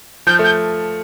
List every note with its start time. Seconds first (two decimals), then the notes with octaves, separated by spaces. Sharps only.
0.27 F3 G6
0.39 A3 G6